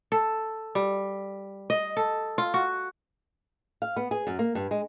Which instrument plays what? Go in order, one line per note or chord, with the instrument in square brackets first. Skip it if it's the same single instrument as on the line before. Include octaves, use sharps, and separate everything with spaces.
[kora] A4
G3
D#5
A4
F4
F#4
[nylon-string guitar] F5
B3
G#4
F#2
A#3
G2
G#3